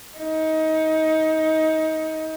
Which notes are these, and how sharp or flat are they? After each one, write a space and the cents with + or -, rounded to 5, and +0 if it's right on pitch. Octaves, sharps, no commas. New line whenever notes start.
D#4 +25